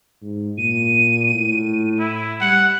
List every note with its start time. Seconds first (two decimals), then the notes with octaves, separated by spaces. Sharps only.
0.22 G#2
0.57 A#2 D#7
1.34 A2
1.99 E4
2.41 G3 F#5 F#6